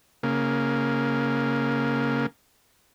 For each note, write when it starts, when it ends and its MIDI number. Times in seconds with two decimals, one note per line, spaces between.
0.23 2.26 49
0.23 2.26 58